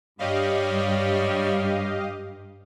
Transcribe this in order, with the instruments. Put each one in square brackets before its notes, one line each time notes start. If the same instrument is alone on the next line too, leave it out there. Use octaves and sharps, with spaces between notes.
[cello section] G2 [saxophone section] G3 C#5 [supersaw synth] G4 D#5 F5